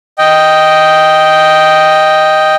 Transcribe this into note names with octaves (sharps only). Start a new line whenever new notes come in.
D#5 G5